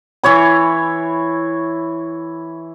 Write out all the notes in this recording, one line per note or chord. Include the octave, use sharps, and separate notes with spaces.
E3 E4 C#5 B5